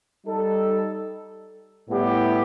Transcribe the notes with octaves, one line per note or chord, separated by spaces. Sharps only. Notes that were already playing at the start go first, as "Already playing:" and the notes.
G3 D#4 A4
A2 G3 B3 E4 G4